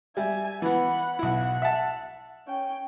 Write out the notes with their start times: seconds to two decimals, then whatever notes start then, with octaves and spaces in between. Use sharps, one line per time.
0.17 G3 E5 G#5
0.62 E3 B3 F#5 B5
1.19 B1 E4 F#5
1.62 E5 A5
2.47 C#4 G5